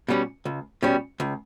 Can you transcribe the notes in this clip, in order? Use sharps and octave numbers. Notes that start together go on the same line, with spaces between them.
B2 G3 C#4
C#2
B2 G3 C#4
C#2